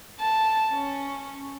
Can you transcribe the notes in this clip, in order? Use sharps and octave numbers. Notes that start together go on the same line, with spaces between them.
A5
C#4